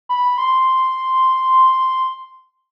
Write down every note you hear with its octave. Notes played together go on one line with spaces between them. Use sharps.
B5
C6